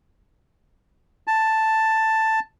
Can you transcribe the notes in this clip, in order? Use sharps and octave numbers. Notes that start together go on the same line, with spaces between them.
A5